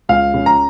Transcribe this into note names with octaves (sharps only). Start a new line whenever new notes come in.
C#2 F5
C#3
A#5